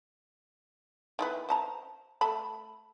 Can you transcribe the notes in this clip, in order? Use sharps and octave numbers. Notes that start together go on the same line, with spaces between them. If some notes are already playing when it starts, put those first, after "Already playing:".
D#3 E3 B4
C5 A5 A#5
A3 A5 B5